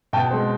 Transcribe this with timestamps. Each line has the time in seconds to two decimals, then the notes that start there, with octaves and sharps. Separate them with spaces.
0.13 B2 G5 A5
0.31 G#3 C4